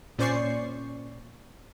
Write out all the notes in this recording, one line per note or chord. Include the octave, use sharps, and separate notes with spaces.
A#2 C#4 C5 D5 C#6 C7